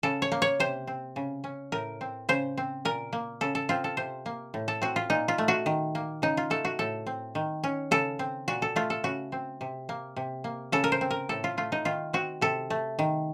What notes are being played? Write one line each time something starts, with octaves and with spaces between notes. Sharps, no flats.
C#3 A4
C#5
A#3
C#5
C3 C5
C4
C#3
C#4
A2 A#4
C4
C#3 C5
C4
A#2 A#4
A#3
C#3 A4
A4
C4 F4
A4
C3 C5
A#3
A2
A4
C4 F#4
F4
A#2 D#4
F4
A3
F#4
D#3
A#3
C#3 D#4
F4
A3 A4
F#4
A2 A4
C4
D#3
C#4
C#3 A4
C4
A#2 F#4
A4
A3 F4
A4
C#3 F#4
C4
C3
A#3
C3
A#3
C#3 A4
A#4
C5
C4
A#4
A2 A4
F4
A3 F4
D#4
D#3 F4
C4 F#4
C3 A4
A3
D#3